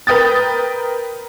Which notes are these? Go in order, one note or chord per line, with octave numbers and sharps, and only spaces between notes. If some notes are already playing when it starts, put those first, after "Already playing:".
A#4 B4 G5 D#6 A6